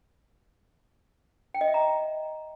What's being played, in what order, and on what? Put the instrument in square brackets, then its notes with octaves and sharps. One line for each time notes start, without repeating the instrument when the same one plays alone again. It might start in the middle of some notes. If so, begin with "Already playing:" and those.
[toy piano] G5
D#5
E5
A#5